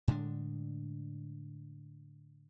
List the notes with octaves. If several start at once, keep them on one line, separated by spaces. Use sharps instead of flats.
A2 D3 G#3 D4